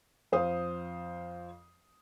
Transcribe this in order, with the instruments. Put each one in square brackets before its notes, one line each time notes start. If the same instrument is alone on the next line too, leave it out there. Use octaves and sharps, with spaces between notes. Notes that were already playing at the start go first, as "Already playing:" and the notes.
[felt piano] F2 C5 F5 D#6